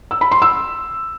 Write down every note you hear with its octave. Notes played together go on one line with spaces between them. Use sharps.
E6
B5
C6
E6